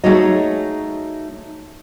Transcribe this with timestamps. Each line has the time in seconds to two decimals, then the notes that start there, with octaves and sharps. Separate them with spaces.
0.04 A3 D#4 F#4 G#4 C#5 D#5